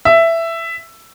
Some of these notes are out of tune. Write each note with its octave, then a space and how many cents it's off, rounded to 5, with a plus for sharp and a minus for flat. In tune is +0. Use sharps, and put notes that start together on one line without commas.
E5 +10